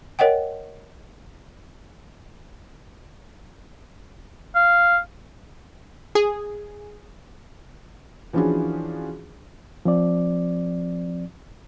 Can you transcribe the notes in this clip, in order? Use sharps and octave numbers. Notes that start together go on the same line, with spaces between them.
A#4 C#5 D#5 F#5 G5
F5
G#4
E3 F3 C#4 D4 F#4 G#4
F3 C4 D5